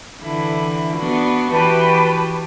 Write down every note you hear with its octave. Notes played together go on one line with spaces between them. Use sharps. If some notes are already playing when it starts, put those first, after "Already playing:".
D3 E3 E4
B3 D4 F#4
E3 F#4 G4 B4 A5 B5